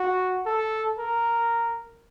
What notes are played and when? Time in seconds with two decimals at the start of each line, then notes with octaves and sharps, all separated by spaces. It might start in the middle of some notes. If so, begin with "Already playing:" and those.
Already playing: F#4
0.46 A4
0.98 A#4